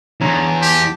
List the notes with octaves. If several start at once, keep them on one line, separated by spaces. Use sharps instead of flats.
E2 D4 C#5 A#5
G4 A5